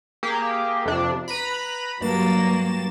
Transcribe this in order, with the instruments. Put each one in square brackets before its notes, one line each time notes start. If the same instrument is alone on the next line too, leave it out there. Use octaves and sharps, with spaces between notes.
[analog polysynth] A#3 G4 G#4
F2 C3 D4
B4 A#5 B5
[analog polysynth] G2 A6 E7 [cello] F#3 A#3